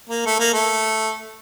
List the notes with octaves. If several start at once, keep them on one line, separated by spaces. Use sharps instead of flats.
A#3
A3
A#3
A3